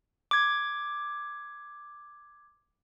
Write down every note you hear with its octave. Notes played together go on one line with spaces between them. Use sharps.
D6 G#6